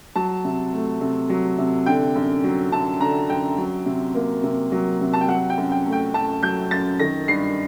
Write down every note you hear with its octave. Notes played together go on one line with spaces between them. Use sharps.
F#3 A5
C3
A3
C3
F#3
C3
D3 G5
F#2
F#3
F#2 A5
D3 A#5
F#2 G5
F#3
C3
A#3
C3
F#3
C3
A5
G5
F#3 F#5
G5
F#2
G5
A3
G5
F#2 A5
F#3 G6
F#2 A6
D#3 A#6
G2 C7